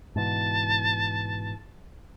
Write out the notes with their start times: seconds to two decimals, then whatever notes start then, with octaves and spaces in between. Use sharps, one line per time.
0.16 G#2 B2 E3 A5